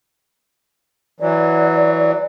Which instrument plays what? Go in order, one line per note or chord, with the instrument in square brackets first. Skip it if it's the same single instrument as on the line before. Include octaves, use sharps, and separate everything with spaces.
[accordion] E3 F#3 [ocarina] D5